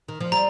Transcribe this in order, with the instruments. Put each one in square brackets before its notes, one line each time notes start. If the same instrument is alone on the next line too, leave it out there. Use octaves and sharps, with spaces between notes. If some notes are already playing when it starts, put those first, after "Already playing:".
[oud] D#3
F3
[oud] G3 [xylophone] A#5